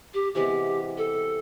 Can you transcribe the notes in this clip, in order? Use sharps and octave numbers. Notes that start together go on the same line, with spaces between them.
G4
C3 E3 G#3 B3 G4
A4